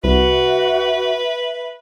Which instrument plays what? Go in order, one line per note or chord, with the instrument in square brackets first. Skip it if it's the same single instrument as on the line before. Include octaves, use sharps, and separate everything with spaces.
[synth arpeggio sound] C2 [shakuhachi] F#4 [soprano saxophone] B4 [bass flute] E5